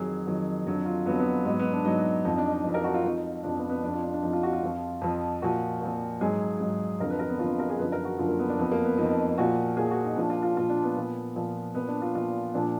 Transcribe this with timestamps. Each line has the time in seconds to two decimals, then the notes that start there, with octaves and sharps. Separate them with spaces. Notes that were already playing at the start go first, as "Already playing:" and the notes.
Already playing: F2 D#3 F#3 G#4
0.27 F2 D#3 F#3
0.66 F2 D3 F#3
0.86 F4
1.06 F2 D3 F#3 B3
1.19 B3
1.45 G#2 F#3 B3
1.59 B3
1.72 D4
1.85 G#2 F#3 D#4
2.25 F2 F3 D#4
2.37 D4
2.51 D#4
2.64 F2 F3
2.74 A#4
2.84 F#4
2.94 F4
3.04 F2 F3 D#4
3.43 F2 F3 D4
3.57 B3
3.69 B3
3.83 F2 F3 D4
3.94 F4
4.03 D4
4.13 D4
4.22 F2 F3 D#4
4.33 F4
4.43 F#4
4.53 F4
4.63 F2 F3
5.01 F2 F3
5.42 A#2 F3 F#4
5.81 A#2 F3
6.21 G#2 F#3 G#4
6.60 G#2 F#3
7.00 F2 D3 F3 A#4
7.11 B4
7.19 A#4
7.29 B3
7.39 F2 D3 F3 F4
7.59 A#4
7.69 G#4
7.79 F#2 D3 F3 B4
7.92 A#4
8.05 F#4
8.18 F#2 D3 F3 F4
8.28 A#3
8.39 B3
8.49 D4
8.59 F2 F3 B3
8.72 A#3
8.85 B3
8.97 F2 F3 D#4
9.38 A#2 F3 F#4
9.77 A#2 F3 G#4
9.91 F#4
10.04 D#4
10.16 A#2 F3 D4
10.30 F4
10.43 F4
10.56 A#2 F3 F4
10.69 D4
10.83 B3
10.96 A#2 F3
11.35 A#2 F3
11.75 A#2 F3 B3
11.88 D4
12.02 F4
12.15 A#2 F3 F4
12.54 A#2 F3 D4